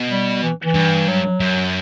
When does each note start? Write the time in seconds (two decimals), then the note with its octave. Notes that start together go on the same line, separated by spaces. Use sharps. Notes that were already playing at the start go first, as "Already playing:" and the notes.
Already playing: B2
0.10 G3
0.42 E3
0.63 E3
0.74 G2
1.08 F#3
1.40 F#2